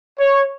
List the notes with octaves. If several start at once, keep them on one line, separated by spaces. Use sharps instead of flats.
C#5